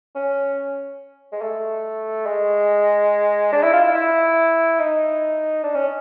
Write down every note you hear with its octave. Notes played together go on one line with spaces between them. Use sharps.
C#4
G#3
A3
G#3
D4
E4
F4
E4
E4
D#4
D4
C#4